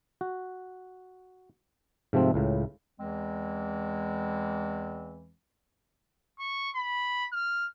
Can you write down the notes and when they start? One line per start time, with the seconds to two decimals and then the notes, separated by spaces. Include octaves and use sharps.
0.21 F#4
2.13 G#2 C3 F3 A3 C4
2.34 C#2 A2 C#3
2.99 E2 E3 G#3 C4
6.40 C#6
6.75 B5
7.32 F6